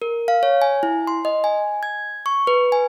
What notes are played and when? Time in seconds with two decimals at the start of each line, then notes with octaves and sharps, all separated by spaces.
0.02 A#4
0.28 F5
0.43 C#5
0.62 G#5
0.83 E4
1.07 C6
1.25 D#5
1.44 G#5
1.83 G#6
2.26 C#6
2.47 B4
2.72 G#5